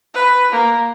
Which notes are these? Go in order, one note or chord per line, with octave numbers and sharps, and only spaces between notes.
B4
A#3